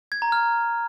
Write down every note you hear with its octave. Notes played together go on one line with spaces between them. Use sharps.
G#6
A#5
F6